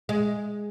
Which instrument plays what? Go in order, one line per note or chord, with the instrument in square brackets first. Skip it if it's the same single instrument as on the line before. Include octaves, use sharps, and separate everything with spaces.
[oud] G#3